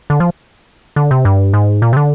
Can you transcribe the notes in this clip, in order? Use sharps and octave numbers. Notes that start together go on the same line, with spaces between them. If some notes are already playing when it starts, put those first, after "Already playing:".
D3
F3
D3
C3
G2
G#2
A#2
C3
D3